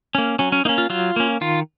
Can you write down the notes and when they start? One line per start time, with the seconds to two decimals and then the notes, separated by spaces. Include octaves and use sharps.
0.15 A#3 C#4
0.39 F#3 C#4
0.52 C#4
0.65 A#3 D#4
0.69 C#4
0.78 F4
0.90 F#3 F4
1.16 A#3 C#4
1.41 D#3 F4